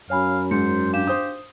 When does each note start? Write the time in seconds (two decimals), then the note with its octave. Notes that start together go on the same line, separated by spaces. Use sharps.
0.10 F#2 C#5 F5 G#5 B5
0.51 G#2 C5 C#7
0.93 D4 G4 F5 E7
1.07 C5 D#6